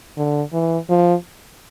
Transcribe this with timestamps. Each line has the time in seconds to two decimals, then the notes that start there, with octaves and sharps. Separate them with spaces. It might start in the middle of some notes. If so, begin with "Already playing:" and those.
0.17 D3
0.53 E3
0.89 F3